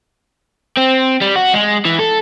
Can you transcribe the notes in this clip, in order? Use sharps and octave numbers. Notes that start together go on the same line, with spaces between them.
C4
G3
F#4
G#3
E3
A4